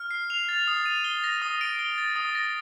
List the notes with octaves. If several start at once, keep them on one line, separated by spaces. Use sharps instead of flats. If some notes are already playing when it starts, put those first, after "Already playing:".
Already playing: F6
C7
F7
A6
D#6
D#7
G7
A#6
D#6
D7
G7
A6
D#6
A#6